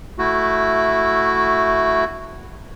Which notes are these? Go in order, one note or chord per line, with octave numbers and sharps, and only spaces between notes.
A3 E4 F#4